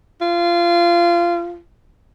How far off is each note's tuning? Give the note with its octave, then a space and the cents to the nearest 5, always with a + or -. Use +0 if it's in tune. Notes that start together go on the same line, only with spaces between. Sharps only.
F4 -20